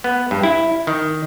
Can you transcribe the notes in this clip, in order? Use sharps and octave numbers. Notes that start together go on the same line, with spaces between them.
B3
G2
E4
D#3